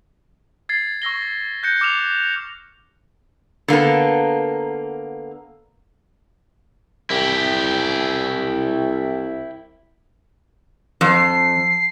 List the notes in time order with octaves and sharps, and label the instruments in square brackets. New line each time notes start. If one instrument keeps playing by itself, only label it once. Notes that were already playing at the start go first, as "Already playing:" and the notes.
[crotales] G#6 A6 C7
C#6 E6 A#6 G7
F#6 G6 A#6 C#7
D6 F6 E7 F7
[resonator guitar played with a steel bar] D3 A#3 B3 A4
[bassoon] C2 [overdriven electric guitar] E4 G4
[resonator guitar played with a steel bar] F2 [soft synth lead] C7